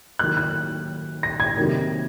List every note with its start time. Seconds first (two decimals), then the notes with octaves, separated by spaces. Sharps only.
0.19 D#3 F#3 A#3 F#6
0.37 F#6
1.23 A#6
1.40 G#6
1.57 C3 D#3 F#3 A#3